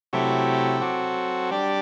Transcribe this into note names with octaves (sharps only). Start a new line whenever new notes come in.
C3 F#3 A3 E4 G4
F#3 C4 F#4 A4
G3 D4 G4 D5